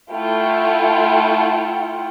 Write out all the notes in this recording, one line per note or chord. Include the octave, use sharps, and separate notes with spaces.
A3 E4 F4 F#5 G5